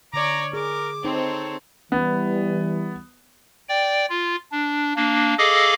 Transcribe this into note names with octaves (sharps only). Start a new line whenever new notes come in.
D3 C#5 D5 A#5 D6
G#4 A#4 D6
C4 D#4 A4 C#5
E3 G3 B3
D5 G5
F4
D4
A#3 D4
G#4 A4 D#5 F5 D6